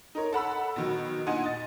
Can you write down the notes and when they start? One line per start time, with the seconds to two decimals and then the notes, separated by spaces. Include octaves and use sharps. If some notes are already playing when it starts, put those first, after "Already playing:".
0.15 D#4 A#4 C#5
0.33 A4 F#5 B5 E6
0.76 B2 D#3 F#3
1.26 A#2 D4 D#4 F#5 G#5
1.44 D#5 A6